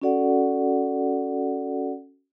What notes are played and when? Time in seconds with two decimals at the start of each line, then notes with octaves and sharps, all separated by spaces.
0.02 C#4 F#4 A4 D5 F#5